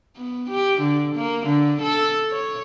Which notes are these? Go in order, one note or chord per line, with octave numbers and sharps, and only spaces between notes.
B3
G4
D3
A#3
D3
A4
C#5